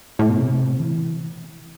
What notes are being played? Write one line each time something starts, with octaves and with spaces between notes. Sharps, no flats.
A2
B2
C3
E3